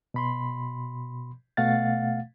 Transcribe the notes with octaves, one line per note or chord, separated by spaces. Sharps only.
B2 B5 C6
B2 A3 F5 F#5 A6